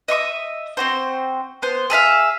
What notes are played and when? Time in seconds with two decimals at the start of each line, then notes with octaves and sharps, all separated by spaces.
0.08 D#5 E5 C#6 D#6
0.77 C4 F#4 C5
1.62 B3 C5
1.90 G#4 A4 E5 F5